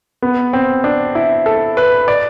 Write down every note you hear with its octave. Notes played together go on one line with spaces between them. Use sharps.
B3
C4
D4
E4
A4
B4
D5